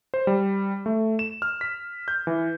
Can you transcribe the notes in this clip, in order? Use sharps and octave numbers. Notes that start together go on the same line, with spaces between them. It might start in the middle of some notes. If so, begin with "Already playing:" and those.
C5
G3
A3
E7
F6
B6
G6
E3